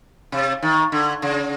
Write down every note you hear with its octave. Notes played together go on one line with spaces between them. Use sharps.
C3
D#3
D3
C#3